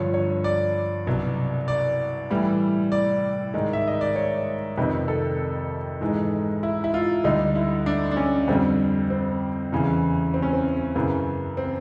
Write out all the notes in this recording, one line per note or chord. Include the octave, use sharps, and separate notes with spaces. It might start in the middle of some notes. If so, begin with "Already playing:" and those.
Already playing: G2 D3 F3 C#5
C#5
D5
C2 B2 F#3
D5
A2 E3 G3
D5
G#2 D#3 G#3
E5
D#5
D5
C#5
F2 C3 D#3 B4
A4
G#2 E3 G#3
E4
E4
F4
D2 D3 G3 D#4
E4
D4
D4
C#4
F2 D3 G3 C4
C4
E2 C#3 E3
C4
C#4
C4
F#2 C#3 E3 B3
C4